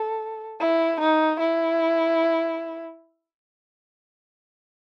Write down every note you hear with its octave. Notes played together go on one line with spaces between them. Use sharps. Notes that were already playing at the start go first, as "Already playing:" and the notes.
Already playing: A4
E4
D#4
E4